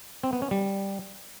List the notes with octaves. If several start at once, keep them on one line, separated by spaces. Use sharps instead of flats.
C4
B3
C#4
G3